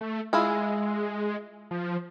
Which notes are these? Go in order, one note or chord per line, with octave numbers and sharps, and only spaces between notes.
A3
G#3 E4 F4 G#4
F3